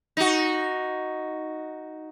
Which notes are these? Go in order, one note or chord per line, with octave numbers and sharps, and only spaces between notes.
D#4 F#4